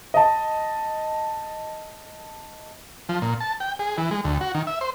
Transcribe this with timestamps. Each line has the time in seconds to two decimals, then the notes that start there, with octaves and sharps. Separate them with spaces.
0.14 D#5 A5
3.09 F3
3.22 A#2
3.41 A5
3.60 G5
3.79 G#4
3.98 E3
4.11 G#3
4.24 D2
4.41 F#4
4.55 D#3
4.67 E5
4.81 C5